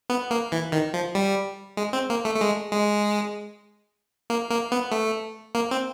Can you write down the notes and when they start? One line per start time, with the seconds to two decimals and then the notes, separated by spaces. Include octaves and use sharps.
0.10 B3
0.31 A#3
0.52 E3
0.72 D#3
0.94 F3
1.15 G3
1.77 G#3
1.93 C4
2.10 A#3
2.25 A3
2.36 A3
2.41 G#3
2.72 G#3
4.30 A#3
4.51 A#3
4.72 B3
4.92 A3
5.55 A#3
5.71 C4